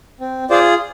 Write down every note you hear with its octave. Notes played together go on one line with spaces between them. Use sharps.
C4
F4 G#4 C5 D5